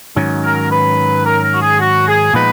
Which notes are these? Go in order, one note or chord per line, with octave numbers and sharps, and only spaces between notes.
G#2 D#3 F#3 C#4
A#4
B4
A#4
A#4
F#4
G#4
F#4
G#4
A#2 F3 G#3 B3 D#4 B4